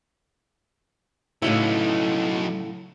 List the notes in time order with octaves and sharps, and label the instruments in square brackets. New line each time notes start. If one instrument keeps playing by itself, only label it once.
[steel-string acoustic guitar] A2 C#3 E4 [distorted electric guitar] F#3 D#4